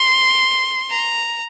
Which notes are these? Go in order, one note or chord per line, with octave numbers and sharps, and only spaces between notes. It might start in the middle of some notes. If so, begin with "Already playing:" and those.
Already playing: C6
A#5